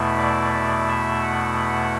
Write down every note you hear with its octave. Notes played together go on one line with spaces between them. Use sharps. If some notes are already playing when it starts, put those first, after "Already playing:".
Already playing: E2 B2 A3 E4
D5
D5
E5
F#5